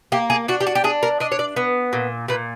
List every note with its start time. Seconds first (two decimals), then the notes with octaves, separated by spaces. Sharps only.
0.12 A#3 G4
0.30 G#4
0.48 D4 F#4
0.61 G4
0.67 F#4
0.75 G4
0.84 D4 G#4
1.03 A#4
1.20 D4 D#5
1.32 C#5
1.39 D5
1.56 B3
1.93 A#2
2.28 A#2 B4